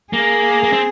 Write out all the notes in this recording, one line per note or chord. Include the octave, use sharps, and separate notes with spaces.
A#3 G#4
A#3
C4